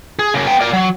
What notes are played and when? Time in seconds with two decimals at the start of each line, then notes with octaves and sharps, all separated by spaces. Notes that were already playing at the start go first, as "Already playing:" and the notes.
0.19 G#4
0.34 C#3 A#3
0.46 B3 G5
0.60 A#4 D5
0.73 F#3